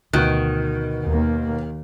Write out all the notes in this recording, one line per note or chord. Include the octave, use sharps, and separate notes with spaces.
D2 B2 D#3 F#4 F#6
D#2 A#3